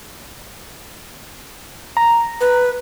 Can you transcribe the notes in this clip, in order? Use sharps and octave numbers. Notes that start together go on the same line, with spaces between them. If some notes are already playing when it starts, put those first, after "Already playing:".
A#5
B4